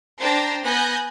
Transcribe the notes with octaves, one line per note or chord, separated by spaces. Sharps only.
D4 C5 G5 A5 A#5 A#6
B3 G#5 F#6 G6 A#6